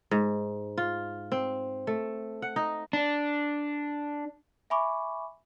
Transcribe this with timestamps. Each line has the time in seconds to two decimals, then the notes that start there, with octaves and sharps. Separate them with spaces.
0.11 G#2
0.77 F4
1.32 C4
1.87 A3
2.42 F#5
2.56 D#4
2.93 D4
4.70 E5 G#5 B5 C#6 D6